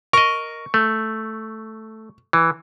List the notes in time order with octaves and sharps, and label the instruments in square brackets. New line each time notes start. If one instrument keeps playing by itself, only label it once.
[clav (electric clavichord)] A#4 D#5 [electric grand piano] C#6
[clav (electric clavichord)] A3
E3